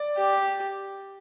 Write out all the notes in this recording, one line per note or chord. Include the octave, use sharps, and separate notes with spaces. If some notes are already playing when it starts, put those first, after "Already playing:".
Already playing: D5
G4